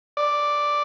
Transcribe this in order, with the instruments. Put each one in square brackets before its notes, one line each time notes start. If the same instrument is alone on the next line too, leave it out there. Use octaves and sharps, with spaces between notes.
[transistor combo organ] D5